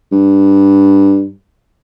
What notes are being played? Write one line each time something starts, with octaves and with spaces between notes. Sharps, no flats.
G2